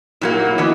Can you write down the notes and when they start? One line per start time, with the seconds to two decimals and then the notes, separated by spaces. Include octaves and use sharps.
0.21 A#2 F#3 A#3 E4
0.30 F#4
0.40 F#4
0.49 E4
0.58 E3 B3 D#4